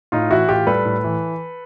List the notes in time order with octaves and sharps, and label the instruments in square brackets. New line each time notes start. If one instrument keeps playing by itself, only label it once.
[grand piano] A2 D#4 F4
E3 E4 F#4
A2 F4 G4
G3 A4 B4
A2
E3